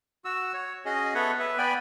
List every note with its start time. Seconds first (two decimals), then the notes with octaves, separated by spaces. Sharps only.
0.25 F#4 E6
0.54 C#5
0.85 C#4 F#4 G#4 D#5
1.15 B3 A4 C#5 E5 F#5
1.40 B4 E5
1.58 B3 D5 G5 G#5 B5